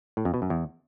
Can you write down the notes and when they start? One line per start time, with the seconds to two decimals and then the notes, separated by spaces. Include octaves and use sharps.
0.17 A2
0.25 F2
0.34 B2
0.42 F#2
0.50 E2